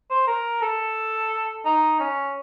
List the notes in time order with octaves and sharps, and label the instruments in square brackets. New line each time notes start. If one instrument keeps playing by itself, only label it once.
[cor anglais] C5
A#4
A4
D#4
C#4